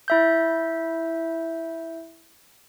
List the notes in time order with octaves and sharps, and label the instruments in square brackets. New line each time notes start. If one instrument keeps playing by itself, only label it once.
[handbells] E4 E5 G6